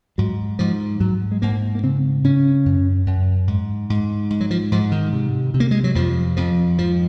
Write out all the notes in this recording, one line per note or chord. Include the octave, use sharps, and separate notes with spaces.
G#2 F#3
G#2 F3
G#2 F#3
G#3
G#2 A#3
A#3
C#3 C4
C#3 C#4
F#2
F#2
G#2
G#2
G#2
F#3
F3
G#2 F3
D#3
C3
C3
A#3
G#3
F#3
F2 F3
F2 F3
G#2 F3